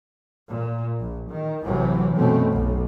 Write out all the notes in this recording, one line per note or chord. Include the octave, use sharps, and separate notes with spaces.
A#2
A#1
D#3
A1 A2 C3 E3 F#3
F#1 B2 A3 C4 C#4
B1